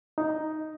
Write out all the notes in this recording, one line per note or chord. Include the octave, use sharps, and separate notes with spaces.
D#4